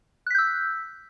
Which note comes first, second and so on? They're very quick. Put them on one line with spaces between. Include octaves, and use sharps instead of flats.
F#6 B6 G6 E6